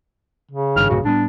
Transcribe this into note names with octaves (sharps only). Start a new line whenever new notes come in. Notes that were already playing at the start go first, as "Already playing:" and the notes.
C#3
G#1 G2 D#3 F6
B1 G2 A#2 F#4
A2 G3 B3 D4